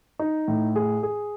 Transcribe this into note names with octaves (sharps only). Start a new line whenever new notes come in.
D#4
A2
G#4
G#4